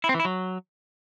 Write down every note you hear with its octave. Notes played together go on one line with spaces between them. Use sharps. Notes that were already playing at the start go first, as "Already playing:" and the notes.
E4
C4
E3
E4
F#3